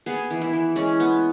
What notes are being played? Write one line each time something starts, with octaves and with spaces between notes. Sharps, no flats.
B3 G#4
E3
E4
E3
G#3 C#4
B3